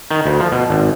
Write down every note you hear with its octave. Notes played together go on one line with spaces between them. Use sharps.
D#3
D2
F3
B2
G#1